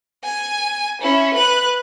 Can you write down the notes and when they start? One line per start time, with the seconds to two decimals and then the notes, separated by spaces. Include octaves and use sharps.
0.24 G#5
1.01 C#4 E4
1.34 B4 F#6